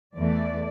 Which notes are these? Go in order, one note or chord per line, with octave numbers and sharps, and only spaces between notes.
E2 E3 A3 D5